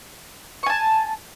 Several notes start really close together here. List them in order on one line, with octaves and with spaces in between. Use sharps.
C#6 G#5 A5